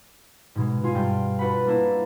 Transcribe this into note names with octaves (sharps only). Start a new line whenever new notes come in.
G#2 B2 G#3
B2 F4 G#5
G2 D5 G5 F6
D4 F#4 B4 F#5 B5
A#3 D4 E4